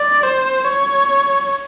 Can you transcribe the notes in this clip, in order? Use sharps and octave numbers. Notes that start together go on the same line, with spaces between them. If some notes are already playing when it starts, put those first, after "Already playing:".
Already playing: D5
C5
C#5